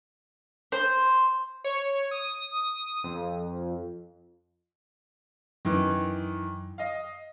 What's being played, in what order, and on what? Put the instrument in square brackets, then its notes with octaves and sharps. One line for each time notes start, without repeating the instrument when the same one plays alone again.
[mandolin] C5
[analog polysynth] C#5
D#6
F2
[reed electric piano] F#2 [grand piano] D#3 E3
[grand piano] D#5 F5